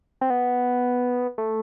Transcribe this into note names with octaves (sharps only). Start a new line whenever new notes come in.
C4
B3
A3